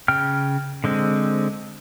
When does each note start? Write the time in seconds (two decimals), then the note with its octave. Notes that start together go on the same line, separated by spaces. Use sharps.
0.08 C#3 G5 F6
0.84 D3 G#3 C4